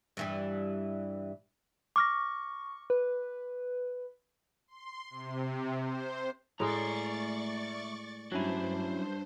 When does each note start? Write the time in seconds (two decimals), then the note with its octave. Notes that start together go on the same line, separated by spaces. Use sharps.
0.17 G2 E3 G3
1.96 C#6 D6 F6 A#6
2.90 B4
4.68 C6
5.10 C3
5.78 C5
6.60 A2 G#3 A3 D5 A#5 C#6 A6
8.32 G2 F#3 C#4 D4 E4 C5